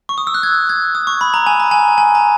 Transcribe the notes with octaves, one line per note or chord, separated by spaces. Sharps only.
C#6
D#6
E6
F#6
G#6
G#6
D#6
C#6
B5
A#5
G#5
A#5
G#5
G#5
A#5